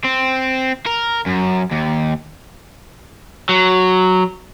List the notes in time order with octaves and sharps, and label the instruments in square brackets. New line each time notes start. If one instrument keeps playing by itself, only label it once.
[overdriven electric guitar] C4
A#4
F#2
D#2
F#3